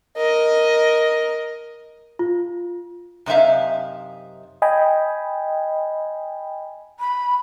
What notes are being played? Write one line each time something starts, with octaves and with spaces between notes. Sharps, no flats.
A#4 D#5
F4
F#2 C3 D#4 E5 F5
D#5 G5 G#5 B5
B5